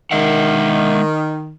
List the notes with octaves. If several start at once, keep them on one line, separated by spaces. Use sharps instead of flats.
D#3 G#3 E5 F#5